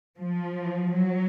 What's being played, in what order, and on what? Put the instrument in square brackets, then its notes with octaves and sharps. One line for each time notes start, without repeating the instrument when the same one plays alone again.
[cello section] F3
F#3